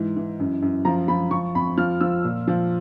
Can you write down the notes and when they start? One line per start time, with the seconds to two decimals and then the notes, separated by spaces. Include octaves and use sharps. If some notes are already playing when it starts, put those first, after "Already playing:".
Already playing: G#2 E3
0.16 E3
0.40 F#2
0.62 F#2
0.85 F3 A#5
1.08 F3 B5
1.31 F3 C#6
1.55 F2 B5
1.78 F3 F6
2.01 F3 E6
2.24 A#2
2.47 F3